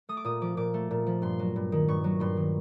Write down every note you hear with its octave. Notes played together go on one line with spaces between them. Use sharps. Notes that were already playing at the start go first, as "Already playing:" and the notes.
A3 D#6
D6
A#2 D#6
F3 D6
A#2 D6
A3
A#2
F3
G2 C6
F#3
G2
D#3
G2 C#6
F#3
G2 C6
D#3